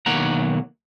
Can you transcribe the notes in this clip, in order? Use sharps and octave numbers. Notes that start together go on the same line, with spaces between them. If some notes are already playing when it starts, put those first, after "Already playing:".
B1 D#3 A#3 C#5 F#5 A#5